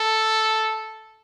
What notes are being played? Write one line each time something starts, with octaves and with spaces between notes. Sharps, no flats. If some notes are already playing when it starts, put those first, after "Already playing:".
Already playing: A4